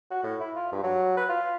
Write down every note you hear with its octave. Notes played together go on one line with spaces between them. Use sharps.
F#4
A2
E4
F4
G2
F#3
B4
F4